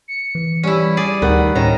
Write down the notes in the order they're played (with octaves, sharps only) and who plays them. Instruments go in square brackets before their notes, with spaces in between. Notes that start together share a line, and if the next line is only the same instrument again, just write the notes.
[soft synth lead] C#7
[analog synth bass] E3
[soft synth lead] G3 [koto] C#4 E4
[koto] G#4 D5
[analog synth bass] D2 [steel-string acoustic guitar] D#3 [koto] B3
[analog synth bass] A2 [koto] D#3 A#5 [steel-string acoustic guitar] C#4